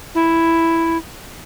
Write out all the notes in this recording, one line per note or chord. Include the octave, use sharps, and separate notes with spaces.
E4